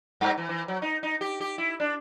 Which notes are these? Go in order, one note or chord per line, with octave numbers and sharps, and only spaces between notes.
G2
E3
E3
F#3
D#4
D#4
G4
G4
E4
D4